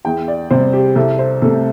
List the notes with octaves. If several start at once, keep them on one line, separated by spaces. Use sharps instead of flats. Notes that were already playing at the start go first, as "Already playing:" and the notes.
E2 G5
D5
C3 G3 C5
G4
C2 A4
C5
C3 A3 A4